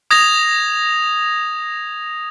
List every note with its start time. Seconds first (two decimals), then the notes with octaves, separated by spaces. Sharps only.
0.11 D#6 G#6 A#6 F7